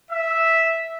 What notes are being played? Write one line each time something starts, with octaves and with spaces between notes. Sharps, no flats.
E5